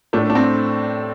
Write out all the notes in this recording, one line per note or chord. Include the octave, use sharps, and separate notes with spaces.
A2 A3 D4
D4
C4